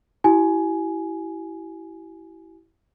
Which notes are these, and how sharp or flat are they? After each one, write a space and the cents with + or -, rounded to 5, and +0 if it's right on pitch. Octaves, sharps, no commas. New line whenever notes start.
E4 +0 G4 -45 G#5 +15